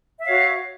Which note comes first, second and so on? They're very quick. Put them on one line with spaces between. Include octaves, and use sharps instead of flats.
E5 F5 C#5 F#4